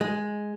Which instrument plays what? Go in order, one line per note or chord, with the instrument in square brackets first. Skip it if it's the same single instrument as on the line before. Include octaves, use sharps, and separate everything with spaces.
[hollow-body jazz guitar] G#3